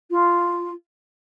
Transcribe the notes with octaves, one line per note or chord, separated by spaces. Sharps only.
F4